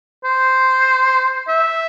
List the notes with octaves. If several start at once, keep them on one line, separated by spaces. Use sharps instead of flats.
C5
E5